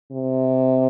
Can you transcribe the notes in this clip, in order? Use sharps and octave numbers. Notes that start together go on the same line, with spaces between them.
C3